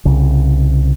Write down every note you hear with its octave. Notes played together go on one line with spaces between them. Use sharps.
C2 C#3